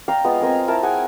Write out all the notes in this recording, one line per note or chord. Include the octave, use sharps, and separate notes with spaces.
D5 F5 G5 A#5
G#3 B3 F4
C4 A#4 D#5 G#5
E4 A#4 A5
G#4 F#5 G#5